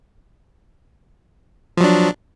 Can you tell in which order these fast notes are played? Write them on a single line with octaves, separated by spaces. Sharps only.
F3 F#3 D4